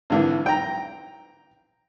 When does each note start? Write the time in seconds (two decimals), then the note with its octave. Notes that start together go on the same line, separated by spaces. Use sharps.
0.10 G#1 D3 E3
0.46 G5 A#5